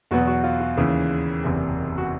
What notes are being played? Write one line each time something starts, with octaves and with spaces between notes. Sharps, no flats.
E2 B2 F#3 B3 F#4
F#4
F4
F4
D#2 C#3 E3
F#1 E2 C3
F#4